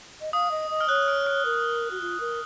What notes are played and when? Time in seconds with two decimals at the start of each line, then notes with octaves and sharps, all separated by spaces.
0.21 D#5
0.33 F5 D#6
0.51 D#5
0.70 D#5
0.81 F6
0.88 C#5 F#6
1.08 F6
1.27 F6
1.45 A#4
1.91 F#4
2.01 F4
2.20 A#4